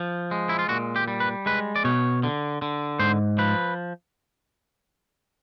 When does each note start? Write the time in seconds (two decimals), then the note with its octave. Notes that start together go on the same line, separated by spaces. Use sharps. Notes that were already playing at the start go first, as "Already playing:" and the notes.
Already playing: F3
0.31 G#3
0.49 E4
0.59 F4
0.69 A#2 F#4
0.96 G4
1.08 G3
1.20 B4
1.46 G#3 B4
1.76 D5
1.84 B2 C#5
2.23 D3
2.62 D3
2.99 G#2 C5
3.38 F3 B4